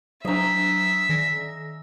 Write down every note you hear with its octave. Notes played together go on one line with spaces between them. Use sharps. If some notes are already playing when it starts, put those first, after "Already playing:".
F#3 D4 D#5 E5 A#5
D#3 A#6